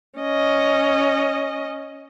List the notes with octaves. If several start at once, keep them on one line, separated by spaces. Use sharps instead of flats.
C#4 D#5